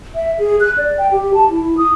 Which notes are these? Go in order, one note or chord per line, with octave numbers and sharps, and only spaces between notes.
E5
G#4
F#6
D5
G5
G4
A5
E4
D#6